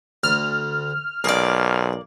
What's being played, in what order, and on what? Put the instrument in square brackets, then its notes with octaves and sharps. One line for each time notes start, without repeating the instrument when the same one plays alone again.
[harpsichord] D2 [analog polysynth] F6
[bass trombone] B1 [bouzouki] A#3 D5 [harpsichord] G#4